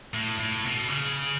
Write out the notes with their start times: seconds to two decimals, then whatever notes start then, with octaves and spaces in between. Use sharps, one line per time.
0.14 A2
0.39 A2
0.64 B2
0.88 C#3